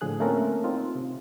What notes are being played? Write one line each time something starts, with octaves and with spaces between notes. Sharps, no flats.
A2 D3 F3 G#4 F#6
A3 A#3 C4 C#4 A4 A#4
C4 D#4 F4
C3